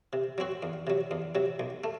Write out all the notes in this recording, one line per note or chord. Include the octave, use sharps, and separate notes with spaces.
C3
F#3 C4 F#4
E2
C3 F#3
E2
C3 F#3
B1
A3